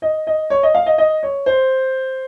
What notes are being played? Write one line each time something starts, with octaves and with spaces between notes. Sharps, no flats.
D#5
D#5
C#5
D#5
F5
D#5
D#5
C#5
C5